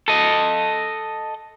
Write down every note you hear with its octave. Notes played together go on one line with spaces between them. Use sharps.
A4 D#5